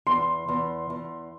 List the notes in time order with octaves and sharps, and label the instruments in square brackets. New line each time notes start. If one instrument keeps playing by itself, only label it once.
[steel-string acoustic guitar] E2 [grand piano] C6
[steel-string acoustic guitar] E2
E2